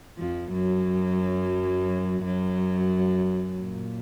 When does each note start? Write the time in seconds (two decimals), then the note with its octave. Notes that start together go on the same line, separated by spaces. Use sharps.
0.18 F2 F3
0.53 F#2 F#3
2.25 F#2 F#3
3.62 A#2